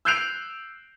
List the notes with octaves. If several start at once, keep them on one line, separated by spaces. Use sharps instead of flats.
E6 F#6 G6 C7 D7 F7